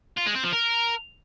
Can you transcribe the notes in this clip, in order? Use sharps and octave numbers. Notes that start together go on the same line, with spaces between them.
F4
G#3
C4
F3
A#4